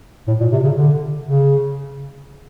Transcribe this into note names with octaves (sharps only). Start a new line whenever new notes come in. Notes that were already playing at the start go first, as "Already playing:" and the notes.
A2
A#2
C3
C#3
D3
C#3